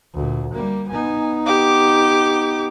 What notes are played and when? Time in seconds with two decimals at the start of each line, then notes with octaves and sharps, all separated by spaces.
0.14 D2 A#2
0.53 G3 A#3
0.89 B3 D#4 G#5
1.46 G4 D6